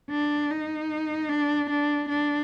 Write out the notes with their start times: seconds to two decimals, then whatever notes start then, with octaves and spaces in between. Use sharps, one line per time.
0.10 D4
0.50 D#4
1.29 D4
1.70 D4
2.09 D4